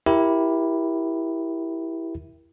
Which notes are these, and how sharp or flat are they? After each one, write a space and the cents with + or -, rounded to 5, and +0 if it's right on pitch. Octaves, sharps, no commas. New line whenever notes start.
E4 +0 G4 -5 A#4 +20